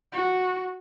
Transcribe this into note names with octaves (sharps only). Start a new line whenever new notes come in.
F#4